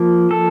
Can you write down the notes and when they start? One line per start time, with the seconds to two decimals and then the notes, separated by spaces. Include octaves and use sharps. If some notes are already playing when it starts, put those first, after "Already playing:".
Already playing: F3 A#3
0.31 A4